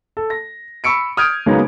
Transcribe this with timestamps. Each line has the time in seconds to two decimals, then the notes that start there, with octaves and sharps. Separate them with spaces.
0.17 A4
0.30 A#6
0.84 B5 C#6 E6 C#7 D7
1.17 D#6 F6 G6 G#6 D7
1.46 C#3 F#3 G#3 A#3 B3 D#4